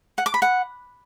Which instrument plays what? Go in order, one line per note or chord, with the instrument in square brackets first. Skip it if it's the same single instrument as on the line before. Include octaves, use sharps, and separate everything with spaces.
[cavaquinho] F#5
D6
B5
F#5